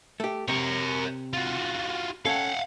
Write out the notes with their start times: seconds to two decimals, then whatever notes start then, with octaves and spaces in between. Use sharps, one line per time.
0.20 A3 G4
0.48 C3 A#4 C#5
1.33 F4 F#4
2.25 C#4 A4 F5 F#5